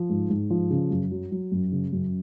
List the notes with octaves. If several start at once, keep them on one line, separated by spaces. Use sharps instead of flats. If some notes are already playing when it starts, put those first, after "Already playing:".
Already playing: F3
G#2
G#2
F3
C#3
F#2
F#3
F#3
F#2
C#3
F#2